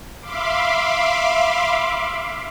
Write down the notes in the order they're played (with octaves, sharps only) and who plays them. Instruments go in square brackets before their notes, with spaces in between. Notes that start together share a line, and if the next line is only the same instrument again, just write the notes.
[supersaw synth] E5 F5 B5 C6 D6